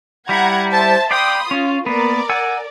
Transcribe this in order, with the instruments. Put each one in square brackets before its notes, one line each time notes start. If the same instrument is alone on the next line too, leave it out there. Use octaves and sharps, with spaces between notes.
[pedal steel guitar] G3 E4 [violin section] F#5 A#5 G#6
[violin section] C5 E5 A5
[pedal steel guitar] D5 F5 G5 [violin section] B5 C6 D#6
[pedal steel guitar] C#4 [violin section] F4
[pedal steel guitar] A#3 B3 [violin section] A#4 D5
[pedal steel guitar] F#5 G#5 E6